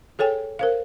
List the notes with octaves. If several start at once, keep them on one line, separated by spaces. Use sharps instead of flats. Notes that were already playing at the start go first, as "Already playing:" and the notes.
G#4 A4 C#5 G5 G#5
A#4 C5 F5